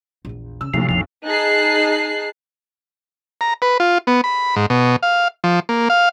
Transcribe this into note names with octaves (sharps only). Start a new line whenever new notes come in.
A#1 E2
C#3 E6
B1 A2 C3 F3
A#1 F2 F3
D#4 G#4 A5 F#6 C7
A#5
B4
F4
B3
B5
G#2
B2
F5
F3
A#3
F5